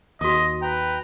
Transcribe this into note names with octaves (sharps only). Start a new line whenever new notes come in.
D#2 F#4 D#5 D#6
B4 G5 A#5